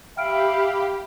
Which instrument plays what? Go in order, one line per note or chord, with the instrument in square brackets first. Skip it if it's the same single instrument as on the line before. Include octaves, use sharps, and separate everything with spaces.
[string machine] G4 [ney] E5 [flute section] F5 B5 [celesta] G5 F6 D7